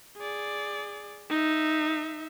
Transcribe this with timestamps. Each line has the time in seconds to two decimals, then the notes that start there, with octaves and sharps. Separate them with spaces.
0.17 G#4 D5
1.30 D#4 E5